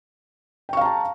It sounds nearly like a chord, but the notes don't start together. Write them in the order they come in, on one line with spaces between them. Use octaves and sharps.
G5 C#6 F5 A#5 A5